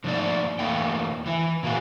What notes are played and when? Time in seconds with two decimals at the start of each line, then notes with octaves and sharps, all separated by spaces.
0.04 D3 F3 A3 A#3 D#4 D5
0.59 E2 A3 A#3 G5
1.26 E3 E4
1.63 A#2 A#3 F#4 G#4